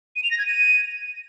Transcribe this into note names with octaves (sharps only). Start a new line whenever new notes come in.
D#7
F7
A#6
G#6
D#7